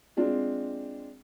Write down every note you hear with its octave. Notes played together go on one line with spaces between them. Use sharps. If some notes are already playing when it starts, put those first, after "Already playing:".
G#3 C4 D4 F4